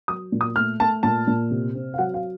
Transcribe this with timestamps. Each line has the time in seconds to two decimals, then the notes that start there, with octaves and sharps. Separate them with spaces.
0.08 F#3 D#6
0.32 A#2
0.41 D#6
0.56 A3 F6
0.80 A3 A5
1.03 A#2 A5
1.27 A#2
1.51 C3
1.75 C4
1.94 F5
1.98 F#3 F#5
2.14 F5